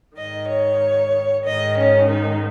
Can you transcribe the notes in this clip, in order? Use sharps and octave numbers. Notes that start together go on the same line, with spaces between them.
G#2 D#3 D#5
C#5
G#2 D#3 D#5
C#4
D#4